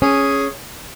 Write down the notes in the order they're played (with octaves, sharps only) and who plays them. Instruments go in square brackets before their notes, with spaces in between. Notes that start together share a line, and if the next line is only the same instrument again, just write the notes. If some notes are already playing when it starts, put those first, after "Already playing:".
[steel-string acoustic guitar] C#4 [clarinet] G#4